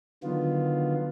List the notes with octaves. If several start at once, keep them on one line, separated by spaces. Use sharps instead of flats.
D3 D#3 F#3 B3 F4